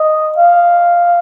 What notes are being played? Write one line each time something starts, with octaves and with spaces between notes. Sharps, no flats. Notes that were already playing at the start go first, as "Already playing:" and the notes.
Already playing: D#5
F5